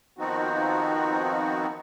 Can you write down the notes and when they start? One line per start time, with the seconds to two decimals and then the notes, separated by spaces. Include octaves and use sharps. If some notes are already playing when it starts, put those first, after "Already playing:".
0.18 D#3 F3 B3 C4 D#4 F#4